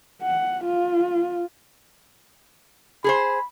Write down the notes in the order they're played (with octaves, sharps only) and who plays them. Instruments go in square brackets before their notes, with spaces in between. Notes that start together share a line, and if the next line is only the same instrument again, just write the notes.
[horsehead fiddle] F#5
F4
[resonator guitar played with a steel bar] G#4 A4 C5 [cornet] B5